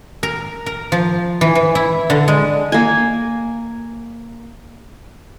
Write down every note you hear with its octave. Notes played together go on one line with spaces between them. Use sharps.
A#4
A#4
F3
E3
E3
E4
D3
G#3
A#3 G#5